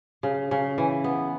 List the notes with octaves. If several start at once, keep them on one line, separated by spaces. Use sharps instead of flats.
C#3
C#3
E3
B3